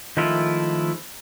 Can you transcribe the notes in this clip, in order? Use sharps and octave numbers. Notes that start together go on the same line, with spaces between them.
D#3 F3 G#3 A3 E4 F4